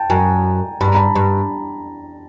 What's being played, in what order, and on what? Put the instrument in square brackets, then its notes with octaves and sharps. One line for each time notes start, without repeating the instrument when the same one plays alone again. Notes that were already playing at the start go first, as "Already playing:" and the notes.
Already playing: [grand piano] G5 A5
[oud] F#2 [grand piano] G#5 A#5
[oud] G2 [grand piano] B5
[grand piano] A#5
A5 B5
[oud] G2